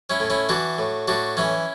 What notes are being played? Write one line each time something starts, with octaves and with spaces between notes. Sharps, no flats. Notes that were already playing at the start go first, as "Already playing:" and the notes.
C#4 E4
A2
C#4 E4
E3 D4 F#4
A2
A2 D4 F#4
E3 C#4 E4